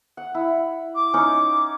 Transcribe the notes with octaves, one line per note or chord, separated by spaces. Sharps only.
F#5
E4
D6
C#4 D#4 C#6